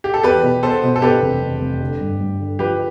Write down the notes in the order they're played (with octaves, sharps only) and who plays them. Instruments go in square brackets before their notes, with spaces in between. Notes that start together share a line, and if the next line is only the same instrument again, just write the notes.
[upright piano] G4
A4
[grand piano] E2 [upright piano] G4 B4
[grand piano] B2
[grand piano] B3 [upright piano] A4 C5
[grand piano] B2
[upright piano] A4
[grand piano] B2 [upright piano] G4 B4
[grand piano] F1
F1
F1
D3
G2
G2
D3
[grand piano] F3 [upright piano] G4 B4